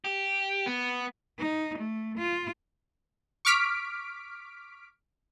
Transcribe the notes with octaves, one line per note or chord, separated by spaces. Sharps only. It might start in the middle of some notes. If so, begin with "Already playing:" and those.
G4
B3
D#4
A3
F4
C#6 D6 F6 B6 D7